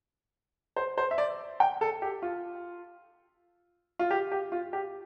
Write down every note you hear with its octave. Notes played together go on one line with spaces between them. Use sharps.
C5
C5
E5
D5
G5
A4
G4
F4
F4
G4
G4
F4
G4